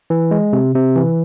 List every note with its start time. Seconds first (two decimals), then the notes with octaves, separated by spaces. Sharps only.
0.10 E3
0.31 G#3
0.53 C3
0.75 C3
0.96 E3